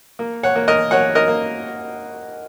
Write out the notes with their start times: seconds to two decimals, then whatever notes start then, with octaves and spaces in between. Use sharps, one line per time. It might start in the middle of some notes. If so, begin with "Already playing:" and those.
0.19 A#3
0.43 C#5 F#5
0.56 A#3
0.68 A#4 D#5
0.91 A#3 C#5 F#5
1.15 A#4 D#5
1.28 A#3